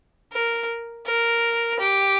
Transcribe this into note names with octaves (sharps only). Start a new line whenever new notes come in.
A#4
A#4
G4